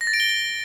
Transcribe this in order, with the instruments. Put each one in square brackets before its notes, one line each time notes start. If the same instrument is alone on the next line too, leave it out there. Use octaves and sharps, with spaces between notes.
[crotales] A#6
A6
D7
G7